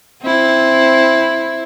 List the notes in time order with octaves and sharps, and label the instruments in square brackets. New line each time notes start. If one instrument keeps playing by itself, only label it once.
[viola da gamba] C4 E4